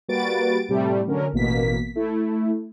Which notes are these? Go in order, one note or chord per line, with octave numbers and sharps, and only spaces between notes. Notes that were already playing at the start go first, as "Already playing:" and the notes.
G3 A#3 F#4 B4 A6 D7
A2 C3 G3 A3
D3 F#3 C#4 A#4
A1 B2 A#3 B6
A3 E4